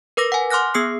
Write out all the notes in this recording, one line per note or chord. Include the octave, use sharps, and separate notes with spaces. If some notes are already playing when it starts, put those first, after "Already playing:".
A#4 B4 D6 A#6
F#5 G#5
C6 D6 F6 F#6 A#6
B3 G#4 D#6 C7